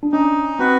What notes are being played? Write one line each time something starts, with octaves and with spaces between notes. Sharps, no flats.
D4
C#4 D#4
C4 F#4 B4